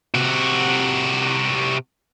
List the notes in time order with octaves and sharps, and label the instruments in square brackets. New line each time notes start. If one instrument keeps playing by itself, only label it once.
[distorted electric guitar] C3 F#4